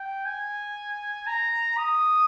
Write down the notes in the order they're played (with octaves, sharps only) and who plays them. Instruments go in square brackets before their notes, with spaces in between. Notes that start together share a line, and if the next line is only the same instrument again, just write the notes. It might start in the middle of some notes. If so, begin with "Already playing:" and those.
Already playing: [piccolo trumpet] G5
G#5
A#5
D#6